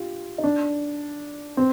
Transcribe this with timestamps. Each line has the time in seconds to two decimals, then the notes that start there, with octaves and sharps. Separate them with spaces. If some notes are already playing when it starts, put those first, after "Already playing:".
Already playing: F4 G4
0.38 D#4
0.44 D4
1.57 C4